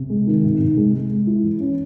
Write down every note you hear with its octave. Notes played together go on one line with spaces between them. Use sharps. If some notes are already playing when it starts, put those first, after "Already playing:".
Already playing: C3
G#3
D#3
C3
C3
G#3
G#3
G#3
E4
E3
C#4